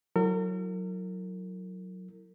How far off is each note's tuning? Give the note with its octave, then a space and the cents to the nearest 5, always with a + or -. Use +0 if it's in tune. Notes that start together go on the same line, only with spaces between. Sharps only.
F#3 -5 E4 +0 A#4 -40